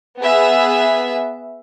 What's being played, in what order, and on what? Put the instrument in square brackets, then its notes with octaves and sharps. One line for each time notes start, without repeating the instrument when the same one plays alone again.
[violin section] B3 G#4 E5